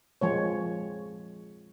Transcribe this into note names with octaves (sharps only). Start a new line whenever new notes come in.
F3 G#3 C#5